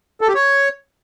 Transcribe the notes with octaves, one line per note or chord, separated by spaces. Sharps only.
A4
G4
C#5